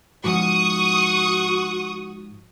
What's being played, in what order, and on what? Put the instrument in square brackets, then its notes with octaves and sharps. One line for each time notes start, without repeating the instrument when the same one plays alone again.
[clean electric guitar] G#2 F3 F#5 [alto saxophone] F#4 [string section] C#6 D#6